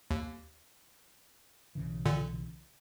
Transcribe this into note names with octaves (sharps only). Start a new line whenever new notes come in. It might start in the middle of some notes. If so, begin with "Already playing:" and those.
D#2
B1 C#3 E3
A#2 D3